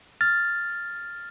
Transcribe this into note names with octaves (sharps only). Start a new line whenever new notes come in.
F6 A6